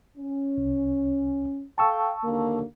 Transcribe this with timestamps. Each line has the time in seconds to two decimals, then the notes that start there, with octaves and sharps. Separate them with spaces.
0.17 C#4
0.58 C2
1.78 A4 F5 G5 A5 C#6 E6
2.24 D#2 D3 A#3